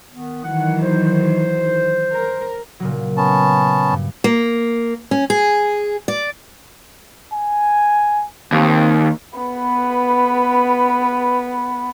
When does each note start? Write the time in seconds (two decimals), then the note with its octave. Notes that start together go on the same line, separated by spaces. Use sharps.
0.12 D#3 B3
0.44 D#3 E3 F#3 F#5
0.82 C5
2.15 A#4
2.80 A#2 C#3 F#3
3.17 B3 C#4 A5
3.90 G2
4.24 A#3
5.11 C#4
5.30 G#4
6.08 D5
7.33 G#5
8.52 D#2 C4
9.39 B3 B4